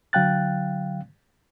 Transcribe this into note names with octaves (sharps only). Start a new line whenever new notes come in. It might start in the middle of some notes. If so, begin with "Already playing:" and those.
D3 F#3 F5 G5 F#6 A6